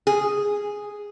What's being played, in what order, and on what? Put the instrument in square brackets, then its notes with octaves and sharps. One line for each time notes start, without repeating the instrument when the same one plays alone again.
[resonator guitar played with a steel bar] G#4